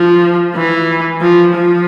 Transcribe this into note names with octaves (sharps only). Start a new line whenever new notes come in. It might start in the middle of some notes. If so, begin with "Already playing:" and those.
Already playing: F3
E3
F3
F3